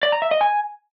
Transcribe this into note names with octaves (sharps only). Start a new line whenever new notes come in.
D5
A#5
E5
D#5
G#5